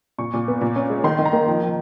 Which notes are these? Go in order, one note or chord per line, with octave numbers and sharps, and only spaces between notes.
A#2 C#6
A#2
B3
A#2
C#4
G#3
D#3 C6
D#3
A#5
A#3
F3
F3